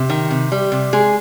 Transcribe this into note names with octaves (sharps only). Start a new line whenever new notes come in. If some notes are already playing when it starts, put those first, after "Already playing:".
Already playing: C3 G4
D#3
C3
G3
C3
G#3 G#4